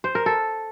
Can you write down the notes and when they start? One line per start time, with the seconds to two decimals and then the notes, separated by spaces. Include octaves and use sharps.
0.04 C5
0.15 A#4
0.26 A4